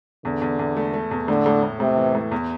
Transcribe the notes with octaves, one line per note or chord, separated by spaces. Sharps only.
E2 D3
E2
E2
A3
A3
E2
A2 D3
A2
A2
A2 C3
E3
A2
E2